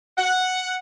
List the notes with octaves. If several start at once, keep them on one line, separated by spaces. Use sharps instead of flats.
F#5